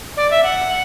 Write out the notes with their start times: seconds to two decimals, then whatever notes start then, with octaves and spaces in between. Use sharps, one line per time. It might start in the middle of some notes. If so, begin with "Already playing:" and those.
0.16 D5
0.31 E5
0.43 F#5